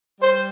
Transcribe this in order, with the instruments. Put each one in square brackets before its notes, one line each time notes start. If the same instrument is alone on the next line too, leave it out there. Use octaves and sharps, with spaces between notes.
[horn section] G3 C5